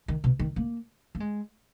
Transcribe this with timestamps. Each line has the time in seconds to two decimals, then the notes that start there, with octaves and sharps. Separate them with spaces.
0.08 D#3
0.24 B2
0.39 D#3
0.56 A#3
1.15 A#3
1.20 G#3